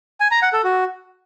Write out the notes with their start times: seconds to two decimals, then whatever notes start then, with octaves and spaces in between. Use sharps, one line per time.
0.20 G#5
0.31 A#5
0.42 F#5
0.53 A4
0.64 F#4